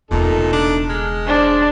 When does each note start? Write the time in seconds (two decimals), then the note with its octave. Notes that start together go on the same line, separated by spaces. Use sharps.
0.11 E1 A#2 C#3 A3 D#4 A4
0.53 D4
0.89 G#3 F6
1.27 D4 C5